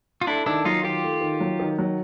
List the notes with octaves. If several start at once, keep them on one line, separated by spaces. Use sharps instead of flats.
F4
A3 D4 E4
D#3 D4 E4
F#3 D#4 F4
D#3 F4 G4
A3
D#3
F#3
D#3
F#3